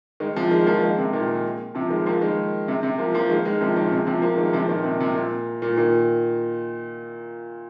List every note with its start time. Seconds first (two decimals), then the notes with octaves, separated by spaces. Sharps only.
0.20 D#3 G#3
0.36 C3 F3
0.51 D#3 G#3
0.67 F3 A#3
0.83 D#3 G#3
0.98 C3
1.13 A#2 D#3
1.75 C3 F3
1.90 D#3 G#3
2.06 F3 A#3
2.21 D#3 G#3
2.68 C3
2.83 C3
2.98 F3 A#3
3.14 F3 A#3
3.29 D#3 G#3
3.45 D#3 G#3
3.61 C3 F3
3.76 A#2 D#3
3.92 C3
4.07 C3 F3
4.22 F3 A#3
4.37 D#3 G#3
4.53 C3 F3
4.68 A#2 D#3
4.84 C3
5.00 C3
5.15 A#2
5.62 A#2
5.77 A#2 D#3